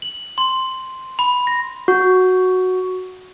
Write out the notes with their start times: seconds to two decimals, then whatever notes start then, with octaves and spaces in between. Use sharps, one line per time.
0.02 F#7
0.38 C6
1.19 B5
1.47 A#6
1.88 F#4